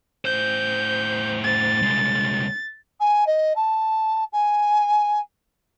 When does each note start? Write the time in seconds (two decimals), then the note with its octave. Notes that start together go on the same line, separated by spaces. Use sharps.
0.25 A2 C5 G6
1.44 A6
1.82 C2 G#3
3.00 G#5
3.26 D#5
3.56 A5
4.32 G#5